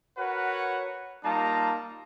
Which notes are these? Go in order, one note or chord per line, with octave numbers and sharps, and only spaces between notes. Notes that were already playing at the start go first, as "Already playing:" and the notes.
F#4 A#4 B4 C#5 F#5
G3 A#3 D#4 F4 A5 A#5